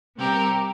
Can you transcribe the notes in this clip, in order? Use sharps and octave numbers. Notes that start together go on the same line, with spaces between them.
C3 G3 C4 G4 A#4